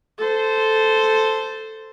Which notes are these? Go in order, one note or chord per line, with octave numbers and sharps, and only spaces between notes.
A4 C5